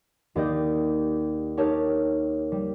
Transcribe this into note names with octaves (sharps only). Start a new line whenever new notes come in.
D#2 G4 D5 D#5 G6
D#4 G4 A#4 C#5 A5
G3